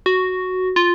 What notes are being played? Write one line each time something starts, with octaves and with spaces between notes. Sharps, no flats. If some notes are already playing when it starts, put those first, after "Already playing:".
F#4
F4